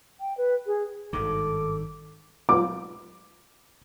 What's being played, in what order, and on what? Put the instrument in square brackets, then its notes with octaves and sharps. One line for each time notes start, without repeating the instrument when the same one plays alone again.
[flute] G5
B4
G#4
[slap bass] G#1 G2 D#3 [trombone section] A4 [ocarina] D6
[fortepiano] D6